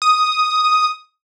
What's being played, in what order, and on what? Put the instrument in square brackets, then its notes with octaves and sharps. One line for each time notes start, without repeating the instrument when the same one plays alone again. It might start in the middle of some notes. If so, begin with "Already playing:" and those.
[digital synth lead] D#6